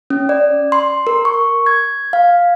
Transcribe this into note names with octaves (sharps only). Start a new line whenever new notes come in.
C#4
D5
C6
A#4
C#6
G#6
F5